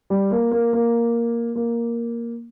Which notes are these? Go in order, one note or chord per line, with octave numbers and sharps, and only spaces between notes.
G3
A#3
A#3
A#3
A#3